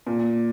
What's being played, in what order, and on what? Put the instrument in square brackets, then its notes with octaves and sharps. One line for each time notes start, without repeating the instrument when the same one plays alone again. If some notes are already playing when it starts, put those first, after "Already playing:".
[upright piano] A#2